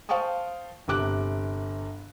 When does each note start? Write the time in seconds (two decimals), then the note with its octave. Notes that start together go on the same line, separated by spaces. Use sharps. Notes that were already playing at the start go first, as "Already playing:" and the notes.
0.09 C5 F5 G5 A5 C#6 D#6
0.88 G1 C3 D6 F#6